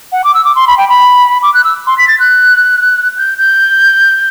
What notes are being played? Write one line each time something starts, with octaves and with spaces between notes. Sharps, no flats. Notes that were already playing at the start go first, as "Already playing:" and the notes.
F#5
D6
E6
D6
C6
B5
G5
B5
D6
F#6
E6
C6
B6
A6
F#6
G6
G6